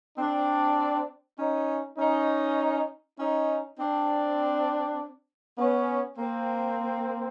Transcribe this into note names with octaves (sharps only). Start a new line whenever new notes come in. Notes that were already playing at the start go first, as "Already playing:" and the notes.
C4 D4
C#4 D#4
C#4 D#4
C#4 D#4
C4 D4
B3 C#4
A#3 C4